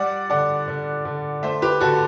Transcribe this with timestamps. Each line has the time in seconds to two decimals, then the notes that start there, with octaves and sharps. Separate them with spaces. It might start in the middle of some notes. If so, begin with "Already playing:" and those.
Already playing: G3 D5 F#5
0.30 D3 D5 F#5
0.68 D3
1.05 D3
1.43 A3 C5 E5
1.62 G4 B4
1.81 D3 F#4 A4